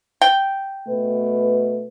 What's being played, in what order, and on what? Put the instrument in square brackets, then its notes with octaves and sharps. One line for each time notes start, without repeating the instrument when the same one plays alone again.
[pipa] G5
[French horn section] B2 A3 B4